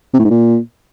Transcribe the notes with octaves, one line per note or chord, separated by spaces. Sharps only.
C3
A2
G#2
A#2